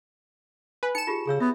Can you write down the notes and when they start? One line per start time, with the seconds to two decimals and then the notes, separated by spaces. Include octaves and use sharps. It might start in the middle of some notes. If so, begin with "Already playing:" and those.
0.83 B4 G#5
0.95 D#4 C#7 E7
1.07 F4 G4 G#4
1.28 C#3 G#4 C#5 E6
1.40 B3 E5